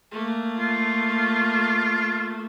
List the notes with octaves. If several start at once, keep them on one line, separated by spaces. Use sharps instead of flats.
A3 A#3
F4